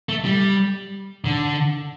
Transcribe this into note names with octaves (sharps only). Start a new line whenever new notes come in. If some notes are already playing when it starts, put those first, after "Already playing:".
A3
G3
D3